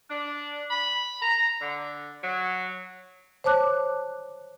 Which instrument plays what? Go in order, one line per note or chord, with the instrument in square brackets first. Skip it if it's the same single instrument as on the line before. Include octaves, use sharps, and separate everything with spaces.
[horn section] D4
B5
A#5
D3
F#3
[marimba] C5 C#5 A5 D6 F#6